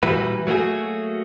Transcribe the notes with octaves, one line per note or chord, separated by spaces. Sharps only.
A#2 E3 G3 E4 F#4 B4
F#3 A3 A#3 F#4 G#4